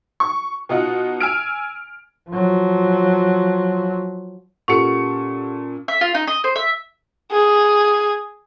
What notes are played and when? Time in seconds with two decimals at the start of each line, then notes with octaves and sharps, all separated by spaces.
0.20 C#6
0.69 B2 D#4 F4 F#5
1.20 G#5 E6 F6 D7
2.30 F3 F#3
4.68 A#2 C#4 G4 A4 F#5 C#6 C#7
5.88 E5
6.01 F4
6.14 D#4
6.27 D#5
6.44 C5
6.56 E5
7.32 G#4